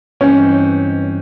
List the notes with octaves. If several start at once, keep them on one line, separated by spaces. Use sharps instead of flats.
G2 E3 G#3 C4 C#4 D#4